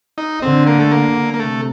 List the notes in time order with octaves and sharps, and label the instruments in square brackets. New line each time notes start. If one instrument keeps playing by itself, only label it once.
[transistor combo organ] D#4
[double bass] D3 [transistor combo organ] C4
[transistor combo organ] A#3
A3
A#3
A#3
[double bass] C3 [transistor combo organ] A3